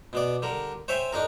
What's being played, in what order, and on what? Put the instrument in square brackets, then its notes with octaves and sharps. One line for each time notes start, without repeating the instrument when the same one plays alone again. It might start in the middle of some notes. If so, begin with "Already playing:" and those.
[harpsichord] B2 B3 D5
D3 G3 A#4
C5 C#5 E5 G5 G#5 C6
D4 D#4 G#4 A#4